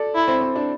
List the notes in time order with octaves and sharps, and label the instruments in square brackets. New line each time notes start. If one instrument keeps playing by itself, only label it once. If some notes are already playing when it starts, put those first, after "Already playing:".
Already playing: [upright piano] A4 D5
[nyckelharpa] E4
[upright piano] C4
C4
D4